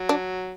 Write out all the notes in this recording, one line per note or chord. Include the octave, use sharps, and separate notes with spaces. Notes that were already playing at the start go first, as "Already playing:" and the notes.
Already playing: F#3
D4